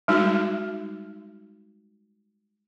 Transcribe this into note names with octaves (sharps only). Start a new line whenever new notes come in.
G3 G#3 D#4 F#4